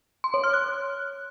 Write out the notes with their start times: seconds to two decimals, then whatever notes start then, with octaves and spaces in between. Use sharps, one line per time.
0.24 C6
0.34 C#5
0.44 F6
0.53 F#6